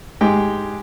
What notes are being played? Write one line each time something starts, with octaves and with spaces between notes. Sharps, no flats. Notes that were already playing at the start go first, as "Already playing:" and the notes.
G#2 G#3 G4 G5